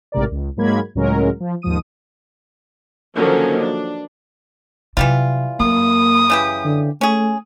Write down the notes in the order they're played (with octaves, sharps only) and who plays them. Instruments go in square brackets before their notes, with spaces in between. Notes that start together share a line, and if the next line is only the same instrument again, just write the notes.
[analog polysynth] A1 G#2 C3 A#4 D5
C#2
G#2 F#3 G#3 A#3 B5 G#6
C#2 A2 F#3 G#3 C#4 A#4
F3
D#2 G#2 F3 D#6 D#7
[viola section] D3 D#3 F3 F#3 A#3 C#4
D4
[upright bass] C3 F#3 [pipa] E3 G3 F4
[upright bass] F#2 [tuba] A#3 [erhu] D#6
[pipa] C#3 E3 G4
[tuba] D3
[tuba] A3 [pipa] C#4 G#4